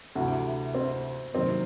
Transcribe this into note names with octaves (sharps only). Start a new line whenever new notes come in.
D2 C3 E3 F#4
C4
E2 C3 D#3 F#3 A#3 C4